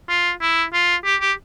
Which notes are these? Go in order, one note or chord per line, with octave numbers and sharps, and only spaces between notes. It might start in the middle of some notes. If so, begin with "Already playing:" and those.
F4
E4
F4
G4
G4